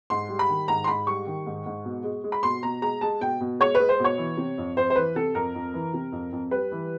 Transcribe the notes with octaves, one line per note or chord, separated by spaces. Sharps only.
G#2 C6
G3
B5
D#3
G#2 A#5
C6
G#2 B5
G3 C#6
D#3
G#2
G#2
B2
G#3
G#3
B5
B2 C6
B2 A#5
G#3 A#5
G#3 A5
B2 G5
B2
G#3 C#5
G#3 B4
C5
B2 C#5
E3
C3
F2
F2 C5
C5
E3 B4
C3 A4
F2 A#4
F2
E3
C3
F2
F2
G3 B4
E3